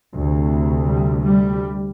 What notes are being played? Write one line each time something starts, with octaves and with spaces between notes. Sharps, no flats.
D2 C3
G3
G3